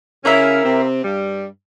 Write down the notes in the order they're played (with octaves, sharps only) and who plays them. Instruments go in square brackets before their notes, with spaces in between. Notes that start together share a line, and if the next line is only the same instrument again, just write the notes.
[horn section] C#3 C#4 [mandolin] A#3 E4 A#4 E5
[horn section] C3 C4
G2 G3